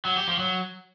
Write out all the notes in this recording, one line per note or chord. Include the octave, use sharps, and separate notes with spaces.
F#3
G4
F3
F#3